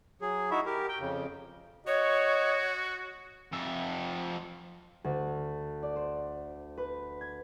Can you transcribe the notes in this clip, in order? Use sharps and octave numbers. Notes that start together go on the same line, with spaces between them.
F#3 G#4
D#4 E4 F#4 E5
G4 A#4
G5
F2 C#3
F#4 C#5 D#5
F2 E5
D2
D5
C5
B4
G#6